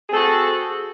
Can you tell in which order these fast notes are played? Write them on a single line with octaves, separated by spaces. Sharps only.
G#4 C4 A4 F#4